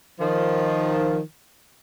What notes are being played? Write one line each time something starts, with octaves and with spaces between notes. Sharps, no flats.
D#3 F3